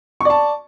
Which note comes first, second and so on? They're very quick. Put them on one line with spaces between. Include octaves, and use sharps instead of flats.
C#6 D5 A5